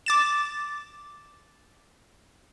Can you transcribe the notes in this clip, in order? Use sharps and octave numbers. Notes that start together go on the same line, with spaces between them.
D6 A6 E7